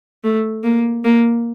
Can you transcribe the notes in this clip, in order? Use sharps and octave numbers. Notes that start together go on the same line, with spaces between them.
A3
A#3
A#3